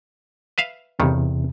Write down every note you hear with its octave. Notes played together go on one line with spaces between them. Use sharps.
B4 E5 F5
A1 E2 G2 C3 D#3